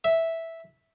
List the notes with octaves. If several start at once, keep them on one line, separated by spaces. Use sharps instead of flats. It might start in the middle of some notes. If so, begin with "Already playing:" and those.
E5